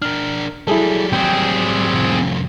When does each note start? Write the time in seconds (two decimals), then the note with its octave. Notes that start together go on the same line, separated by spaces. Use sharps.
0.02 D4 A#4 F6
0.67 F#3 G3 E4 G#4 A4
1.13 C4 G#4 G5
1.94 C2 F2